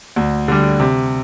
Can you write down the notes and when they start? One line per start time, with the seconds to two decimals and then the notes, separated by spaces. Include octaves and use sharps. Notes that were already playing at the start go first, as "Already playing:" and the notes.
0.16 D2
0.48 D3 G3
0.80 C3